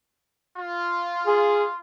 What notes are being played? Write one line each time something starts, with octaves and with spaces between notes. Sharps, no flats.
F4
G#4